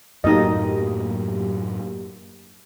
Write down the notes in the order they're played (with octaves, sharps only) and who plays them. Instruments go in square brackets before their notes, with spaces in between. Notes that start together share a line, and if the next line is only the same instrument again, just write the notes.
[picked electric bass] F#2 A2 A3 [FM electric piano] F#3 A#3 G4 [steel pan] D#4 D#5